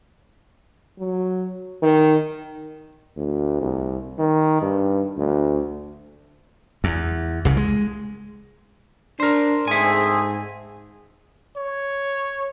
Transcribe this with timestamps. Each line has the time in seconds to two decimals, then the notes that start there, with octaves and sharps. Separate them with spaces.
0.99 F#3
1.82 D#3
3.16 D2
3.61 C2
4.18 D#3
4.62 G2
5.17 D2
6.84 E2
7.45 C2 C#3
7.57 G#3
9.20 D4 A#4 C5
9.68 G#2 A3 C4 G#4 E5 G#5
11.57 C#5